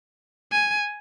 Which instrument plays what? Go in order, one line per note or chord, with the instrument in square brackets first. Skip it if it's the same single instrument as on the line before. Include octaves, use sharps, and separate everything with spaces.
[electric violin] G#5